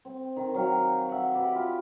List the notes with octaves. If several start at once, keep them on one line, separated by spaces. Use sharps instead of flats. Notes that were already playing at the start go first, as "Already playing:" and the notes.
C4
D#3
F#3 F5 G5
E5 F#5
G4 B4 D5
F4